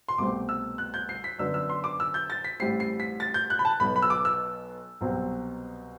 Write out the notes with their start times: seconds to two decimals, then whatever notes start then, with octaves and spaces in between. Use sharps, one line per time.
0.08 C6
0.18 C2 B2 A3 C4 D6
0.49 E6
0.78 F#6
0.94 G6
1.09 C7
1.24 B6
1.39 F#2 D3 F#3 B3 D4 E6
1.54 E6
1.69 C6
1.84 D6
2.00 E6
2.14 G6
2.30 A6
2.44 B6
2.60 A1 A2 G3 C4 C7
2.80 C7
3.00 B6
3.20 A6
3.34 G6
3.50 F#6
3.59 B5
3.65 A5
3.80 B1 B2 F#3 B3 B5
3.96 B5
4.02 E6
4.10 D6
4.25 E6
5.01 C2 B2 F#3 C4